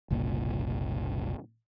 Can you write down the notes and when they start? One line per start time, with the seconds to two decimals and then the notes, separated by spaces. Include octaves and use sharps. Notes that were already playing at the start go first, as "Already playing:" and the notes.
0.10 F#1 C2 A#2